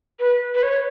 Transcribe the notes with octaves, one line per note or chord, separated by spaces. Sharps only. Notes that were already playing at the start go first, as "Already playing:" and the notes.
B4
B4
C#5